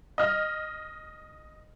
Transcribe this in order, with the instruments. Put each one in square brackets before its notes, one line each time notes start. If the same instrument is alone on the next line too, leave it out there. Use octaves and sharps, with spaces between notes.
[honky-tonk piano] D#5 F6